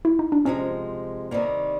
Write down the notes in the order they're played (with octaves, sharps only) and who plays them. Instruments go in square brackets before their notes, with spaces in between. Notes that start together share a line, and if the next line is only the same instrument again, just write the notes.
[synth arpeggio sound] E4
D#4
D4
[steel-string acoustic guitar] C3 F3 G#3 [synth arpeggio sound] C#4
[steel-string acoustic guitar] C3 D#3 G3 A#3